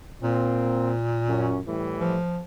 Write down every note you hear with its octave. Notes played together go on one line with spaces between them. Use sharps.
A#2 A#3 C4
F#2 C#4
A2 E3 G3
F3